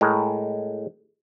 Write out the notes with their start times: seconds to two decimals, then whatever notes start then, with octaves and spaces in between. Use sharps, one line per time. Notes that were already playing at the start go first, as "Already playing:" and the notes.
0.01 A2 G#3 A#4